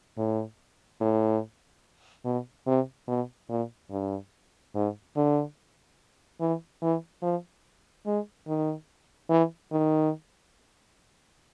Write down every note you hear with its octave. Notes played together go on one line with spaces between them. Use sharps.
A2
A2
B2
C3
B2
A#2
G2
G#2
D3
E3
E3
F3
G#3
D#3
E3
D#3